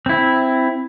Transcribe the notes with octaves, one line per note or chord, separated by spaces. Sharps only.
C4 E4